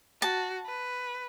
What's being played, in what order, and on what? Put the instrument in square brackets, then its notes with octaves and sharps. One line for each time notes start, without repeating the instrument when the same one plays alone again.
[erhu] F#4 [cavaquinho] A5
[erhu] B4